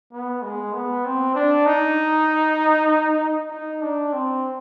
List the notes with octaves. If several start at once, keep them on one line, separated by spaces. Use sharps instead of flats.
B3
G#3
B3
C4
D4
D#4
D#4
D4
C4